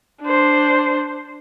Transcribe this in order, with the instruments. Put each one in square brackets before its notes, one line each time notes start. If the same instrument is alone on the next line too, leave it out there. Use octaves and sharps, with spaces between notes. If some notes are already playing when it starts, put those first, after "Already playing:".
[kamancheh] D4 C5